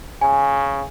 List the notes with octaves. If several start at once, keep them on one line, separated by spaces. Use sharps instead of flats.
C#3 G#5